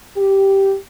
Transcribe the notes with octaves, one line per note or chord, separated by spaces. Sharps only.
G4